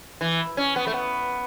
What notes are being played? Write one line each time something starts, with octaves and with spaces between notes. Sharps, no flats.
E3
C#4
B3
A3
B3